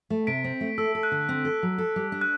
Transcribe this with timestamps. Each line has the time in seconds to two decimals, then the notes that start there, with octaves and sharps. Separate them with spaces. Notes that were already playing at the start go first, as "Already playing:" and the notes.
0.10 A3
0.27 C3 B6 D7
0.44 C4
0.61 A3
0.78 A4 E6
0.95 A4
1.03 F#6
1.12 D3
1.29 C4
1.45 A4
1.63 F#3
1.78 A4
1.96 G3
2.12 D4
2.21 F#6